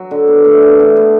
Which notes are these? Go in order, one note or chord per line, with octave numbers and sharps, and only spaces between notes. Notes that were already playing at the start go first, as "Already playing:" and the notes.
Already playing: F#3
D3
B3
A3
E3
D4
B3